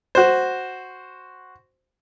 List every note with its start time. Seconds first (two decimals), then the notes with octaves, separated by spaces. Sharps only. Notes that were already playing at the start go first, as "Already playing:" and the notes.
0.15 F#4 C5